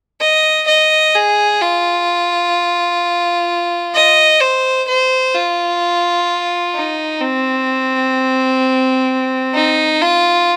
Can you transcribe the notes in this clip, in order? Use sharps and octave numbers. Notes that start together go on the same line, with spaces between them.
D#5
D#5
G#4
F4
D#5
C5
C5
F4
D#4
C4
D#4
F4